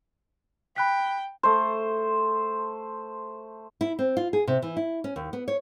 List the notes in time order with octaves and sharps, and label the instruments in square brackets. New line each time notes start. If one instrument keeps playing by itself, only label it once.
[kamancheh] G5 [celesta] B5 F#6 B6
[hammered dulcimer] A3 C5
[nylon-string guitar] E4
C4
F4
G#4
C3
E3
E4
C#4
D#2
B3
C#5